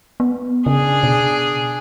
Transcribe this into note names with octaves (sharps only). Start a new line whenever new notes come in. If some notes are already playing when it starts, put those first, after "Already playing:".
B3
C#3 D4 G#4
B2